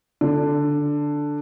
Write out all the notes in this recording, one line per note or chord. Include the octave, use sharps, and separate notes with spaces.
D3